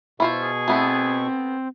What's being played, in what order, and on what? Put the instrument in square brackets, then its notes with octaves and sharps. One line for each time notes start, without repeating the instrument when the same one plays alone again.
[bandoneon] B2 C#6 [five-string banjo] E4 F4 C5
[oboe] G#4
[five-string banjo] A3 B3 E4 [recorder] C4